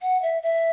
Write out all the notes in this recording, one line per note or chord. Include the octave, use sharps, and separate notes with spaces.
F#5
E5
E5